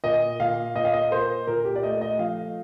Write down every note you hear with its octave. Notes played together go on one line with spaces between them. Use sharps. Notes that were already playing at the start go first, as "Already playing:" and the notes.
A#2 D#5
A#2 F5
A#2 D#5
F5
D#5
A#3 C5
A#2 A#4
G4
D5
A3 D#5
D#5
F3 F5